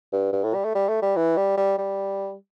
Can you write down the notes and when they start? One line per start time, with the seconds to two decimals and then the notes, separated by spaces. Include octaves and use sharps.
0.13 G2
0.33 G2
0.44 A2
0.54 G3
0.65 A3
0.75 G3
0.89 A3
1.02 G3
1.16 E3
1.37 G3
1.57 G3
1.78 G3